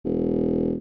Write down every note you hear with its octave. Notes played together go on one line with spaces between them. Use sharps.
E1